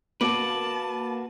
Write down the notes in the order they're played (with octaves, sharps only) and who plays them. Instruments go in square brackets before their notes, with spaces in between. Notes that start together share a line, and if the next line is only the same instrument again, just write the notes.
[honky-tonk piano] A#3 [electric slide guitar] F#4 B4 [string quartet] A5 [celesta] D6 D7 F#7